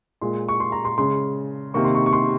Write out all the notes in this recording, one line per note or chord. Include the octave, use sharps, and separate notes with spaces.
A#2 G#3 C6
C#6
C6
A#5
C6
C#3 G#3 C6
C3 D#3 A#3 C#6
C6
C#6
C#6
C6